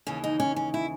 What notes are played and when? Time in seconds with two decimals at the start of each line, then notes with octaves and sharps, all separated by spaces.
0.07 D#2 C#3 E3 C#4
0.24 D#4
0.40 C#4
0.56 C#4
0.74 E4